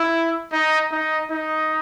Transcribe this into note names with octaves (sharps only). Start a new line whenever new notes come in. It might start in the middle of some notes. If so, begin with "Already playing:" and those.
Already playing: E4
D#4
D#4
D#4